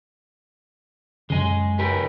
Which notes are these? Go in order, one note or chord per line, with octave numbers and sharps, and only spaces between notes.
F#2 C#3 G#3 G#4
G4 A#4 B4